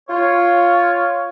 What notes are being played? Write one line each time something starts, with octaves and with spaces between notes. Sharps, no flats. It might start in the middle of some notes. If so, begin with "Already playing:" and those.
F4 C#5